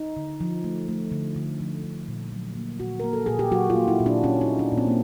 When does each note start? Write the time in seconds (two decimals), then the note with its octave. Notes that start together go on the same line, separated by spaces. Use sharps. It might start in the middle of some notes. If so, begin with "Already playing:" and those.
Already playing: D#4
0.17 D3
0.41 F3
0.64 A3
0.88 A3
1.12 D3
1.36 D3
1.60 F3
1.84 D3
2.08 A#2
2.32 F#3
2.55 A#3
2.80 A#2 F#4
3.00 A#3 A#4
3.13 A4
3.26 A#2 G#4
3.39 G4
3.52 F#3 F#4
3.70 F4
3.76 A#3
3.88 E4
4.00 A#2
4.06 D4
4.24 A#2 C#4
4.41 D#4
4.48 A#3
4.59 D4
4.72 A#2
4.77 C4
4.87 A#3